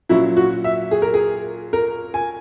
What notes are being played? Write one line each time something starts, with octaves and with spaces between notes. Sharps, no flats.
A#2 F#3 C#4 E4
F#4
E5
G#4
A#4
G#4
A#4
G#5